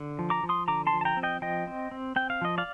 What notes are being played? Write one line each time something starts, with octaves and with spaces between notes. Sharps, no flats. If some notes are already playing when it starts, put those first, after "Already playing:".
Already playing: D3
F3
A#5 D6
F3
C6 D#6
D3 A#5 D6
A5 C6
F3
A5
G5 A#5
C4
D#5 G5
F3 D#5 G5
C4
C4
C4 G5
F5
F3 D#5
D5 F5